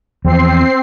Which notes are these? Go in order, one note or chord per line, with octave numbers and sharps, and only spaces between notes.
E2 F3 C4 C7